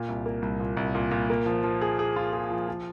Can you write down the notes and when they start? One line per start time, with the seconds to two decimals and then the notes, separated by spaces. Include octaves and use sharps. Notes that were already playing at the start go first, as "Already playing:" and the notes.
Already playing: A#2
0.09 C2
0.26 A#3
0.42 C2
0.60 A#2
0.77 C2
0.95 A#2
1.11 A#2
1.30 A#3
1.46 F3
1.64 F3
1.81 G#4
1.99 G#4
2.16 F4
2.33 G#4
2.51 F3
2.68 F3